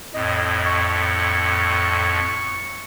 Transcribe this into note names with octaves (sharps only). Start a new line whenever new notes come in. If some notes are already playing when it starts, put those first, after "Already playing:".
F2 A2 D#5
C#6